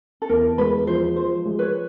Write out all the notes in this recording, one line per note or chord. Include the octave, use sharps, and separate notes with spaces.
A4
E2 A#4
G#3 B4
F3 C5
F3 C5
G#3
B4 C#5